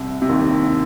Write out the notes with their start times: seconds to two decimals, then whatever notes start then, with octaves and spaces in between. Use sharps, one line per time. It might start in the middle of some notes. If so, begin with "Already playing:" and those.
Already playing: C2 C3
0.22 C3
0.29 D#2 D#3